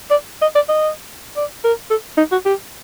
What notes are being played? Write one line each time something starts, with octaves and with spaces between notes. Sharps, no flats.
D5
D#5
D5
D#5
D5
A#4
A4
D#4
F#4
G4